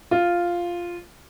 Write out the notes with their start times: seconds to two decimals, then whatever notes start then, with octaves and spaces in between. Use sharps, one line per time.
0.11 F4